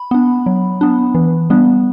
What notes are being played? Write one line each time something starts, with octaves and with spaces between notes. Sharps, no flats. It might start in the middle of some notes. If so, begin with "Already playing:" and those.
Already playing: B5
B3 D4
F#3
B3 D4
E3
G3 B3 D4